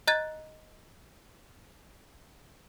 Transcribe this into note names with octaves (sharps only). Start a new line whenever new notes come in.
D#5 A#5 F#6 G#6 A6